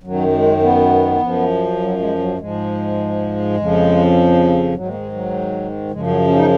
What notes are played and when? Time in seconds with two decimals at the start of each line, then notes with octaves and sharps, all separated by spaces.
0.03 F#2 D#3 F#3
0.33 G#3
0.62 B3
1.21 F#2 F3
1.80 F#3
1.99 G#3
2.19 F#3
2.38 G#2 F3 G#3
3.57 F2 C#3 F3
4.74 G#2 D#3 F#3
4.88 A#3
4.94 G#3
5.13 F#3
5.91 F#2 C#3 F3 G#3
6.07 F#3
6.27 C#4
6.36 D#4